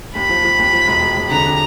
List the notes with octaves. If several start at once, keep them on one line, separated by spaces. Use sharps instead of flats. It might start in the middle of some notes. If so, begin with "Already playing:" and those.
D#2 B5
F3
F3
D#2
F3
E1
E1
E1
D3 A#5
D3